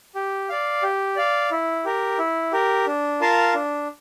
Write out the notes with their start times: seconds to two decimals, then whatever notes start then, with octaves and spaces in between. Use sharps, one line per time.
0.15 G4
0.49 D5 F5
0.83 G4
1.16 D5 F5
1.51 E4
1.85 G4 A#4
2.18 E4
2.52 G4 A#4
2.87 D4
3.20 F4 A#4 F5 A5
3.54 D4